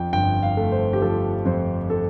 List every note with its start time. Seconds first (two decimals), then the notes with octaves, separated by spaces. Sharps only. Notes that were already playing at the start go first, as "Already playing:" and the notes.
Already playing: F2 F3 G5
0.13 G1 G5
0.43 F5
0.57 A3
0.72 C5
0.93 G4
1.02 F3 A4
1.45 F2 C5
1.90 A4